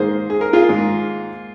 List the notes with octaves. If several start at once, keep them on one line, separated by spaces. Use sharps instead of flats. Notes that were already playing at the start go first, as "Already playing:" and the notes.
Already playing: G#2 D#3 A#3 G#4 C5
G#4
A#4
F4 G#4
G#2 D#3 A#3